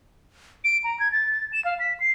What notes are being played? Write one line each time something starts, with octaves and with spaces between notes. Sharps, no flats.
D7
A#5
G#6
A6
A6
E7
F5
B6
C7